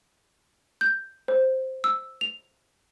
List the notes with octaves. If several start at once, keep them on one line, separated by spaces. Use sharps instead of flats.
G6
C5
E6
F7